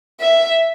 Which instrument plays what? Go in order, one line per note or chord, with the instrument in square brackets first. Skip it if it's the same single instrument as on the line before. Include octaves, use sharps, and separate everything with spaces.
[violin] E5